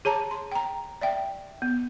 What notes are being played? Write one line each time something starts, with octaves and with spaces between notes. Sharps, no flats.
G#4 C#5 A5 A#5
C6
G5 A#5
D5 E5 G5
B3